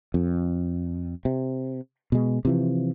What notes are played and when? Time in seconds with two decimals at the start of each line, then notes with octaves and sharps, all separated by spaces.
0.14 F2
1.25 C3
2.12 B2 G#3
2.45 C3 E3 F3